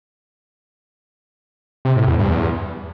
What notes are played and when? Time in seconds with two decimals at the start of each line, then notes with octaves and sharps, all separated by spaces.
1.85 C3
1.96 A2
2.07 E2
2.19 G2
2.30 E2